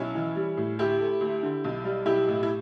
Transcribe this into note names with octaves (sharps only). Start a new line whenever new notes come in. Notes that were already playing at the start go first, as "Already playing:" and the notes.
Already playing: B1 C#4 E4
E3
G3
A2
D2 E4 G4
A3
D2
D3
B1
G3
B1 E4 G4
A2
E4